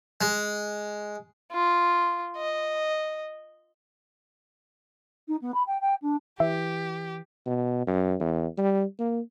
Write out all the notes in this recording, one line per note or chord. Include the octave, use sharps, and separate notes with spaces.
G#3
F4
D#5
D#4
B3
B5
G5
G5
D4
E3 G4 E5
B2
F#2
E2
G3
A#3